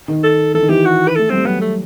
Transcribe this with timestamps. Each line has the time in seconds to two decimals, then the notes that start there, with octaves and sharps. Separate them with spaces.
0.08 D#3
0.23 A4
0.54 E3 A4
0.62 D#3
0.69 E3 G4
0.85 F#4
1.08 B4
1.16 A3 A4
1.30 G3 C4
1.45 F#3 B3
1.61 A3